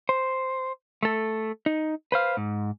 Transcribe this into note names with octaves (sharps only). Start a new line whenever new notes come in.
C5
A3 A4
D#4
B4 C5 F5
G#2